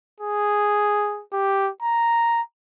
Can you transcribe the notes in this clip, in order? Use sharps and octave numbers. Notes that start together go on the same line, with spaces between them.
G#4
G4
A#5